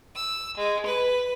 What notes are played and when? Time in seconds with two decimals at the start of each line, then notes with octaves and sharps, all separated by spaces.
0.16 E6
0.56 G#3
0.86 B4